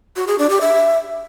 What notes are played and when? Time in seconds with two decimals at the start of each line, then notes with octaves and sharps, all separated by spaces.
0.16 F#4
0.27 G#4
0.39 D4
0.50 G4
0.61 E5